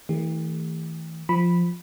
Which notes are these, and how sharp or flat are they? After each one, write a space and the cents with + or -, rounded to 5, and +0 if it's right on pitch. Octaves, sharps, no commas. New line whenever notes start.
E3 -30 A3 +20 G4 +40
F3 +0 B5 -5